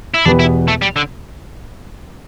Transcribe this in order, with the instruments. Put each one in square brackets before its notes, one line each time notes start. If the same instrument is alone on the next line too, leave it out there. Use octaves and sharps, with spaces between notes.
[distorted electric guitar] E4
[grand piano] E2 B2 B3 G4 B4 [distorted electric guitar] D4
[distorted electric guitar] E4
A3
G3
D3